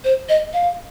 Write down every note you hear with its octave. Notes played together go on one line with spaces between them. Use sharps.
C5
D#5
F5